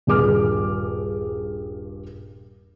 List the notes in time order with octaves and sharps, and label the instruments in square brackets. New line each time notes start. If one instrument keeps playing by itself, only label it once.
[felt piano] D#1 G2 G#4 D6 F6